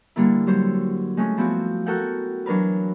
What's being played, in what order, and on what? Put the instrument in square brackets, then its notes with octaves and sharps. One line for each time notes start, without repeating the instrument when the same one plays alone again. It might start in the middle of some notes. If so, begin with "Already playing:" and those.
[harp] D3 G3 A#3 E4
F#3 G3 C5
G#3 A3 C#4
F3 B3 C4 E4 F#4
F#4 A4 A#4 F#5 G5
E3 F#3 D4 A#4 B4